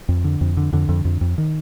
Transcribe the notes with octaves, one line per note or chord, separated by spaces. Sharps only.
F2
D3
F2
D3
F2 D3
F2
F2
F2
D#3